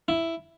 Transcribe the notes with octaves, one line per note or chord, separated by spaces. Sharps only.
E4